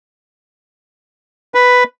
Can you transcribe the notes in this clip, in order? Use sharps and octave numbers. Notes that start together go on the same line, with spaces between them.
B4